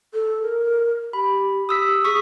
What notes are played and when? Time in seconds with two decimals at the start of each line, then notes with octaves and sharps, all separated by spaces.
0.14 A4
0.42 A#4
1.13 G4 B5
1.69 G4 D#6 E6 B6
2.05 G#4 C#6 D#6 B6